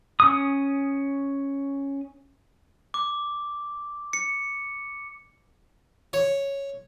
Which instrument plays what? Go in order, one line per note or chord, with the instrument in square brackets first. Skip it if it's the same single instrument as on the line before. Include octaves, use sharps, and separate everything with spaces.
[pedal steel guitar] C#4 D#6
[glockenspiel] D6
C#7
[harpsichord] C#5